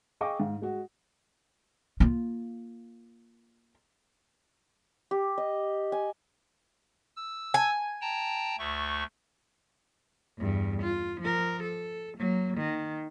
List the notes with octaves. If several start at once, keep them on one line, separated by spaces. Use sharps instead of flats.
G#4 D#5 F5 G5 C#6 D6
G#2 F5
G#3 F#4
A#3 F4
G4
D#5
G#5
E6
G#5
G5 A5 A#5
D2 A3 C#6
E2 G2
F4
F3 A#4
A4
F#3 A#3
D#3